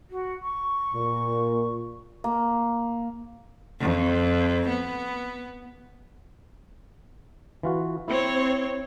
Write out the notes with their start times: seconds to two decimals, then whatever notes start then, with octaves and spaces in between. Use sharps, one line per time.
0.10 F#4
0.42 C#6
0.94 A#2
2.24 A#3
3.80 F2
4.69 B3
7.63 E3 F4 F#4
8.08 C4 E4 C#5